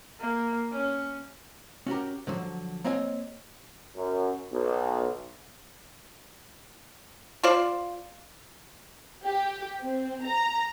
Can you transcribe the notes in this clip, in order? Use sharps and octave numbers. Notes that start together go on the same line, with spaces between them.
A#3
C#4
C#4 F#4 G4 A#4
D3 F3 F#3
A#3 C4 C#5 D#5 G#5
F#2
B1
F4 C5 D5
G4
C4
A#5